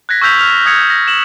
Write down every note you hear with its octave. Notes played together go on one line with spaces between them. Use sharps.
F#6 G#6 A#6 B6
C#6 E6 F6 G6 B6 F7
F6 F7
D#6 F6 G#6 C#7 F7
A#6
E7 F#7